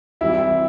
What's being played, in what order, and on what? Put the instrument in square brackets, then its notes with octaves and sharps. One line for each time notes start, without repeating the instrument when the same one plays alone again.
[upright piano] C2 C3 E3 G3 E4 E5